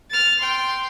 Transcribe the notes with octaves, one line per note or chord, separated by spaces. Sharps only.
F6 A6
G5 C6